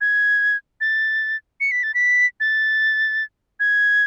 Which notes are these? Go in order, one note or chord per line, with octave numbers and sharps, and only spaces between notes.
G#6
A6
C#7
B6
A6
B6
A6
G#6